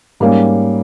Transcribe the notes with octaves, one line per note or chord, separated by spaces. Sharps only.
G#2 G3 A#3 C#4